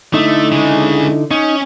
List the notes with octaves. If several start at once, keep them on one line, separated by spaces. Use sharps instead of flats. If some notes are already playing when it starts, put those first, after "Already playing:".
D3 A3 D#4 E4
C#3 G#3
C#4 D#4